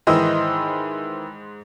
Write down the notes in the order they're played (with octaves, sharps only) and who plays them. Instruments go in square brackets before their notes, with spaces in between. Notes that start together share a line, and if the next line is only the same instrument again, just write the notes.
[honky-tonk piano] G#2 C5 D#5 [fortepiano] D#3 E3 E4